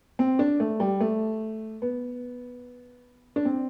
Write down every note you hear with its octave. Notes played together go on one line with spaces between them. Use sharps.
C4
D4
A3
G3
A3
B3
D4
C4